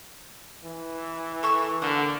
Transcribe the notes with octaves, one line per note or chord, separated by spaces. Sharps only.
E3
A4 C#6 E6
D3 A#3 F#5